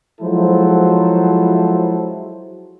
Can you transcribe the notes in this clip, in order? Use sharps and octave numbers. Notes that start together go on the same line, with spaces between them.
F3 F#3 G#3 E4 A4 C5